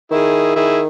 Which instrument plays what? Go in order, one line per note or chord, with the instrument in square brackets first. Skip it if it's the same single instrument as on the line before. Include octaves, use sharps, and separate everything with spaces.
[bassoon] D#3 [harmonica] E4 G#4
[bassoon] D#3 [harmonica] E4 G#4